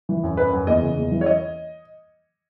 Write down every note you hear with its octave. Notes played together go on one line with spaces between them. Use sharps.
E3
F#2
F#2 B4
F#2
E2 D#5
C#3
E2
E3
C#5
D#5